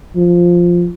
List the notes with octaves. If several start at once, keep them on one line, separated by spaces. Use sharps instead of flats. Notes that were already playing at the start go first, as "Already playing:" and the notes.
F3